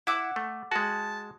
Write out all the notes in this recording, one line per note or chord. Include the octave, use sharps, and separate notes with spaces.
E4 F#5 D6 E6
A3
G#3 F#4 A5